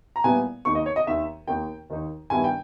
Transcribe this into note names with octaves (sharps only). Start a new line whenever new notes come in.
A#5
A#2 G3 B3 E4 G#5
D#2 D#3 A#3 D#4 C#6
D#5
C#5
D#5
D#2 D#3 A#3 D#4 E5
D#2 D#3 A#3 D#4 G5
D#2 D#3 A#3 D#4
G2 D#3 G3 B3 E4 G#5
G5